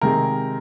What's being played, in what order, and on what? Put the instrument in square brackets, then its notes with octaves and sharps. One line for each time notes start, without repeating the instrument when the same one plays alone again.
[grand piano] C3 D#3 G#3 A#4